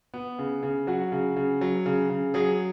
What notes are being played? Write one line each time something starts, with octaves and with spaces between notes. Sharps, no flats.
B3
C#3
C#3
F#3 F#4
C#3
C#3
F#3
C#3
C#3
F#3 G#4